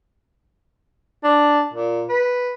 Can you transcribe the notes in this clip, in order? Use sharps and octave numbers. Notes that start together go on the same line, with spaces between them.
D4
A#2
B4